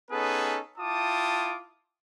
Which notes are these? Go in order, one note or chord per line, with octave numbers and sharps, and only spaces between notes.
B3 C#4 D#4 G#4 A4 B4
E4 F4 G5 A5 D6 D#6